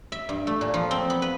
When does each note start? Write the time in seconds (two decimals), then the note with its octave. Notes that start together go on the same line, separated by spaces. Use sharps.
0.12 E5
0.29 G2
0.47 A3
0.61 A#2
0.74 F3
0.91 C4
1.10 B3
1.22 B4